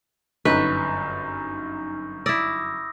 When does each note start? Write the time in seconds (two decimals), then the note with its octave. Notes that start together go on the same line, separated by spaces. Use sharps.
0.45 G1 F#2 D#4 B4 C#6 G6
2.26 E4 D5 D#6 E6 A#6